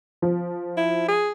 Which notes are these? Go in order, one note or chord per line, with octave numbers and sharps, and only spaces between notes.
F3
E4
G#4